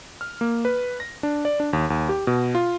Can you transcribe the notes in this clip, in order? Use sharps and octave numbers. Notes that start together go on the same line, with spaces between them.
F6
A#3
B4
A#6
D4
D5
D4
D#2
D#2
G4
B2
F4